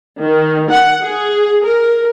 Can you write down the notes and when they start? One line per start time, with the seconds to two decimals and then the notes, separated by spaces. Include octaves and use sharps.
0.20 D#3
0.70 F#5
1.03 G#4
1.64 A#4